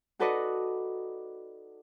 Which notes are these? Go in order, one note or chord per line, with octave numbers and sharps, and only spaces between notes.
D#4 F#4 A4 B4 D5 D#5